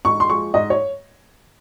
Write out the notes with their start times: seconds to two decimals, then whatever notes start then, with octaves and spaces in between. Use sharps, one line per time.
0.05 G#2 C#6
0.20 C6
0.29 F3 G#3 C#6
0.54 G#2 D#5
0.70 C#5